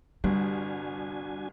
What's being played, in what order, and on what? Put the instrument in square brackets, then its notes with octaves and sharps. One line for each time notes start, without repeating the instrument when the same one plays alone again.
[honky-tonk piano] G1 C2 [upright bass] G3 [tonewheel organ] D4 F#4 G#5